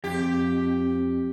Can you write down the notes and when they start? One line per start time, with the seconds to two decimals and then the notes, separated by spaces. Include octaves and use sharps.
0.04 F2 G4